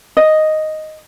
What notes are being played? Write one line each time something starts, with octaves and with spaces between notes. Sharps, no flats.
D#5